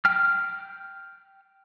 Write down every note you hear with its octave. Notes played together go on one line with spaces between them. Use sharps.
G5 F6